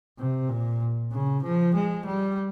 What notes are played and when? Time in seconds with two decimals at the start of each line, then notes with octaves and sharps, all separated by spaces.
0.19 C3
0.49 A#2
1.12 C#3
1.42 F3
1.74 G#3
2.06 G3